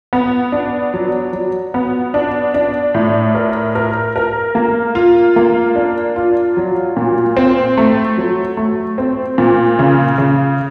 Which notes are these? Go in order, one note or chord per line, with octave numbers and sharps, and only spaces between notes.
B3
D4
F#3
F#3
B3
D4
D4
A2
A#4
A#4
A#4
A#3
F4
A#3
D4
F4
F#3
A#2
C4
A3
F#3
A3
C4
A#2
C#3
C#3